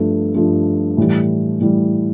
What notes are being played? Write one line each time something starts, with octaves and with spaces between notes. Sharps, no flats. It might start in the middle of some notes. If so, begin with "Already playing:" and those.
Already playing: G2 F3 A3
G2 F3 A3
A2 E3 G3
A2 E3 G3